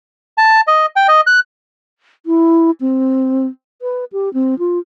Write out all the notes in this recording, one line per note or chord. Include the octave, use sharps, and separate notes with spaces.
A5
D#5
G5
D#5
F#6
E4
C4
B4
G4
C4
F4